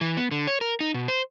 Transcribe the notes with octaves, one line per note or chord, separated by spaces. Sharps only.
E3
B3
D3
C#5
A#4
D#4
B2
C5